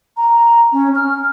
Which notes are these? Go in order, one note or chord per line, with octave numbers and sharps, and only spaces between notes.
A#5
C#4
F6